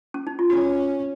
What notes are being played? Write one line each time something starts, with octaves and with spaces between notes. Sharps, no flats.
C#4
D#4
F4
C#4 F#4